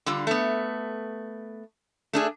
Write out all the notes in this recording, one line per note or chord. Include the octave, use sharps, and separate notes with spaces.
D3 G3 F4
A3 B3
A3 D4 G#4